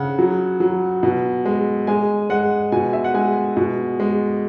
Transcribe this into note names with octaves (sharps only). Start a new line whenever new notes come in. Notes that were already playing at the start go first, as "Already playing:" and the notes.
Already playing: C#3 F#5
F#3
F#3
B2
G#3
G#3 G#5
G#3 F#5
B2 G#5
E5
F#5
G#3 G#5
B2
G#3